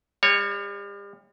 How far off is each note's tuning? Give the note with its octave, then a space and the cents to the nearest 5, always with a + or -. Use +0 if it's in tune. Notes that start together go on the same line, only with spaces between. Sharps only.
G3 +40 C#5 +0